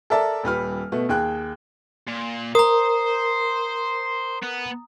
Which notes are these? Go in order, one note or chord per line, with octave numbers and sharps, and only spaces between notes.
A4 A#4 D5 E5 A5
D#1 G3 B4 F6
B2 A3 B3
D#2 G#4 G5 F#6
A#2
A#4 C5 A#5 D#6
B3